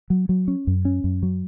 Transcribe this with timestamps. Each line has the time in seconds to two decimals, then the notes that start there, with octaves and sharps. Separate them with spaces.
0.10 F#3
0.29 F#3
0.48 C#4
0.67 F#2
0.85 C#4
1.04 F#2
1.23 F#3